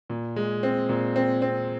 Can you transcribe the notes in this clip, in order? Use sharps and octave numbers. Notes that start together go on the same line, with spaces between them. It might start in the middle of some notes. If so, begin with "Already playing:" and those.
A#2
G#3
C4
A#2
C4
C4